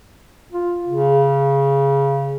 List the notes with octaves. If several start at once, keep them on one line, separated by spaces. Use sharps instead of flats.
F4
C#3